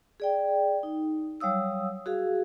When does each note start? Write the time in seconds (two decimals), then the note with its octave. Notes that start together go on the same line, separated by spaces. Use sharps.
0.20 G#4 D5 G5
0.83 D#4
1.40 F#3 G3 C#5 F5 D#6 E6
2.06 F#4 G#4 F5